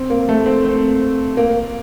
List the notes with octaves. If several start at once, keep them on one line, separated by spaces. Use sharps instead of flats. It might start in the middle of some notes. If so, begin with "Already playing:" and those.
Already playing: C4
A#3
A3
C4
C4
A#3